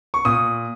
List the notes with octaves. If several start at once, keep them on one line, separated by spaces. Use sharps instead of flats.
C#6
A#2 D#6